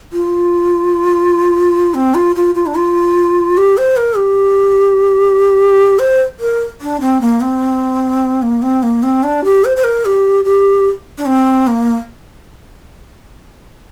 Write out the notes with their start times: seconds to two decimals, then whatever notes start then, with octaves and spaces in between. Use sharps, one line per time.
0.13 F4
1.94 C4
2.14 F4
2.36 F4
2.55 F4
2.66 D4
2.75 F4
3.57 G4
3.77 C5
3.97 A#4
4.17 G4
5.99 C5
6.40 A#4
6.81 D4
7.01 C4
7.21 A#3
7.41 C4
8.42 A#3
8.62 C4
8.83 A#3
9.03 C4
9.23 D4
9.44 G4
9.65 C5
9.77 C5
9.84 A#4
10.05 G4
10.45 G4
11.18 D4
11.26 C4
11.67 A#3